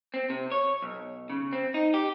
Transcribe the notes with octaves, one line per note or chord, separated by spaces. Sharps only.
C4
C3
C#5
B1
C#3
C4
D#4
G4